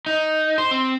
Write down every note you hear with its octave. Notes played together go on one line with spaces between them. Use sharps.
D#4
C5
C4